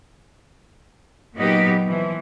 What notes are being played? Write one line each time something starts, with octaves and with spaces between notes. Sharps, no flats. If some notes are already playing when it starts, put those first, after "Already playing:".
A#2 F#3 B3 D#4 G4
E3 F3